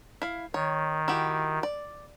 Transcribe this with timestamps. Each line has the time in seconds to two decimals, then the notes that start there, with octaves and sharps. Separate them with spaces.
0.22 E4 F5
0.54 D#3 C#5
1.08 E4 F#4 G4
1.63 D5